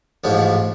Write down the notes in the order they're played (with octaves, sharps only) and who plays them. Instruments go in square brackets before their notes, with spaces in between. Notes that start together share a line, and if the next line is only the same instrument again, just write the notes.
[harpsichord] A1 G#2 F3